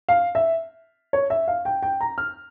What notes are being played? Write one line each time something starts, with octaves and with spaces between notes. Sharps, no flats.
F5
E5
C#5
E5
F5
G5
G5
A#5
F6